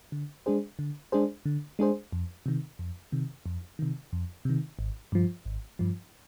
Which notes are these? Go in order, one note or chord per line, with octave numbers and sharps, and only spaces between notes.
D3
G#3 D4 G#4 C5
D3
G#3 D4 G#4 C5
D3
G#3 D4 G#4 C5
F2
C3 D#3
F2
C3 D#3
F2
C3 D#3
F2
C3 D#3
G#1
G2 F3
G#1
G2 F3